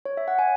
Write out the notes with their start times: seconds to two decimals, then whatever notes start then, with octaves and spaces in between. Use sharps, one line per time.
0.05 C#5
0.17 E5
0.28 F#5
0.39 G#5